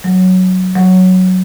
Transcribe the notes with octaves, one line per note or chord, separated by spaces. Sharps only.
F#3
F#3